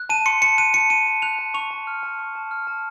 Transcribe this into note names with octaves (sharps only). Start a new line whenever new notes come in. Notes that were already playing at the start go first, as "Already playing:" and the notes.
Already playing: F#6
A5 D#7
C6 C#7
A5 C#7
F#6 D#7
A5 C#7
C6 D#7
A5
F#6 F7
A5
C#6 F7
A5
F6
A5
C#6
A5
F6
A5